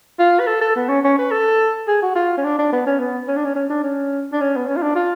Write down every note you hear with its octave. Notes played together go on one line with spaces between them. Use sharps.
F4
B4
A4
A4
B3
C#4
C#4
B4
A4
G#4
F#4
F4
C#4
D4
D4
B3
C#4
B3
C#4
D4
C#4
C#4
D4
C#4
D4
C#4
B3
C#4
F4
D4
F4